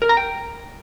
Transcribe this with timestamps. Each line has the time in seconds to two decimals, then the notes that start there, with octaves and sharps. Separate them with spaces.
0.02 A#4
0.09 A#5
0.17 G5